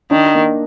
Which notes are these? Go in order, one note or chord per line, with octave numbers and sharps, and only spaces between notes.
D#3 D4
A#3